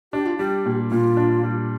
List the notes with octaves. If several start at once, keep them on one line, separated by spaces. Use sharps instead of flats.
D4 G4
F4
G3 G4
A#2
A#2 F4
D4
G3